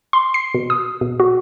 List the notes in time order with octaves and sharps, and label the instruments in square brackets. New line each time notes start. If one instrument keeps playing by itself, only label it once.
[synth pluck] C6
C7
B2
D#6
B2
F#4